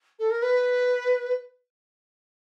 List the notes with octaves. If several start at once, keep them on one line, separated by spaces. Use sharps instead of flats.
A4
A#4
B4